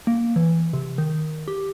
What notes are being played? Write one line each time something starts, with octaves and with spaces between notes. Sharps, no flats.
A#3
E3
C3
D#3
G4